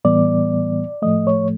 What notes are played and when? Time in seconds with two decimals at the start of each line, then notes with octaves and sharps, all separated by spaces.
0.05 A2 E3 G3 B3 D5
1.02 A2 F3 A3 D#5
1.27 C#5